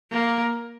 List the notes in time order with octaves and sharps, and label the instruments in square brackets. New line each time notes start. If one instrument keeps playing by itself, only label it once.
[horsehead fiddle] A#3